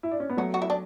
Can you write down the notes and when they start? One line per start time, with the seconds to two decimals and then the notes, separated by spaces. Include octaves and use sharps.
0.03 E4
0.11 D4
0.20 C#4
0.29 B3
0.37 F#3 A3 F#4
0.54 F#4
0.62 E4
0.70 D4